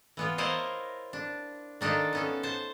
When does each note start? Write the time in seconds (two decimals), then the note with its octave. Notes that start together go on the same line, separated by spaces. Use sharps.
0.17 E3 B3 F4
0.38 E4 F4 A#4 C5 C#5 D#5
1.13 D4
1.81 D#3 D4 D#4 F4 A4
2.13 B3 C#4 A4
2.43 C5 A5